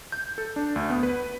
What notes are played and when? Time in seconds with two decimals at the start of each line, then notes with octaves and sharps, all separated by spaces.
0.12 G6
0.38 A4
0.56 D4
0.76 D2
0.90 B3
1.03 B4